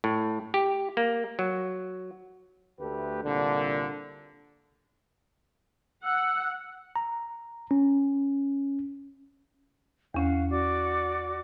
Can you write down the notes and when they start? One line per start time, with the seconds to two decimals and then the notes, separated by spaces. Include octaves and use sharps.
0.04 A2
0.54 G4
0.97 A#3
1.39 F#3
2.80 D2 A3 G4 B4
3.23 C2 A#2 D3
6.04 F#5 E6
6.96 A#5
7.71 C#4
10.14 E2 C#4 F5 F#5
10.50 F#4 D5 D6